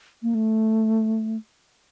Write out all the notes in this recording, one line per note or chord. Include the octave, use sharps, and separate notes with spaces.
A#3
A3